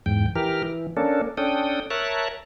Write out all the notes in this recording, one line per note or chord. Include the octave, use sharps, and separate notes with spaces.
E2 G#2 G5
E3 G4 A#4 F6
E3
A#3 C#4 D4 A4
C#4 D4 A4 G5 D#6
A#4 C#5 E5 A5 F#6